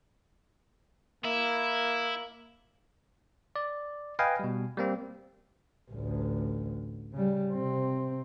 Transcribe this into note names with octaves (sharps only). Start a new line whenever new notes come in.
A#3 E4
D5
B4 D#5 F5 G5 G#5
B2 G3
G3 A#3 C4
A1 D2
C#3 G3
C3 C4